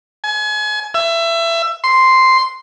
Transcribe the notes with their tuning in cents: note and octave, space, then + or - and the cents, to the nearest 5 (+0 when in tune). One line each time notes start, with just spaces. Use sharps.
G#5 +30
E5 +25
C6 -5